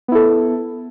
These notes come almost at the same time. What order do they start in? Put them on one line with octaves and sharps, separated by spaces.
B3 E4 A4